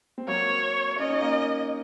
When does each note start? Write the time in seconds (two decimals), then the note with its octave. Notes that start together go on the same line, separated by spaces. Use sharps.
0.18 C4
0.28 F#3 A#3 C#5
0.99 C#4 D#5
1.10 D#4
1.21 A#3 C#4